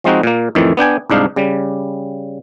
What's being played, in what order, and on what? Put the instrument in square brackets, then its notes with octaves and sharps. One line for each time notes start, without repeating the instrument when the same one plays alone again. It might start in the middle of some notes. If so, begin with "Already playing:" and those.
[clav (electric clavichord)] F3 G#3 C4 D#4 F#4
A#2 A#3
F2 A2 D#3 E3
B3 D4 G5 G#5
C2 G#2 D4 D#4 F5
C#3 G3